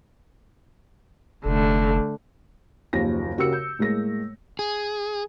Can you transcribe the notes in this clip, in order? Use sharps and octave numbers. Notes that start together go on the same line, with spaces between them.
F1 D3 A3
F#1 D#2 F3 A#6
C#3 F#4 G4 A#4 E6 C#7
G6
A2 G#3 A#3 A#6
G#4